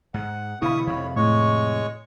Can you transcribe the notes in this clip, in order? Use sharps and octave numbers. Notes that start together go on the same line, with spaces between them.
G#2 F#5
B2 D3 E3 E4 F5 B5 C#6 D#6
F2 C3 D#3 C#5
A2 G#3 C#5 C#6